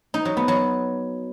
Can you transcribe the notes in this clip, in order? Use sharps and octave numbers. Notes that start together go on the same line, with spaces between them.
D#4
F#3
B3
F#3